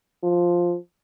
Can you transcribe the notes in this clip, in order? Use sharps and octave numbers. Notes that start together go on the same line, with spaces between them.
F3